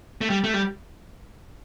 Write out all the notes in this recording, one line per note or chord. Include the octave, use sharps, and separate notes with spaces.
A3
G3
A3
G3